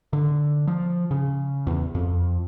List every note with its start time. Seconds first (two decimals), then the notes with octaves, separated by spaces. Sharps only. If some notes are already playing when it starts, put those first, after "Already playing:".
0.13 D3
0.68 F3
1.11 C#3
1.67 E2
1.95 F2